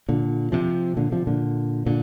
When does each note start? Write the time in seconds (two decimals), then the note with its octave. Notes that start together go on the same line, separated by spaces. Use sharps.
0.09 A#2 D3
0.52 C3 F3
0.97 A#2 D3
1.12 C3 F3
1.27 A#2 D3
1.86 A#2 D3